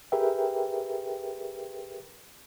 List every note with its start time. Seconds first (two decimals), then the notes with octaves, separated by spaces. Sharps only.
0.12 G4 G#4 A#4 B4 E5 G5